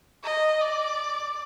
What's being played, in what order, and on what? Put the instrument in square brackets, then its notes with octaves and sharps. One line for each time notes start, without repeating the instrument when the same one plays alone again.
[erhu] D#5
D5